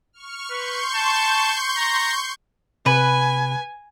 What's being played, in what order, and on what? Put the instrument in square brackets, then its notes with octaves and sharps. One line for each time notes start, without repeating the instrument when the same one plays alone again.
[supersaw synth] C#6 F6
[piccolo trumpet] B4 [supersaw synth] C6 C#6 G6
[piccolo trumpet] A5
A#5
[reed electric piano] C3 [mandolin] B4 [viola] G#5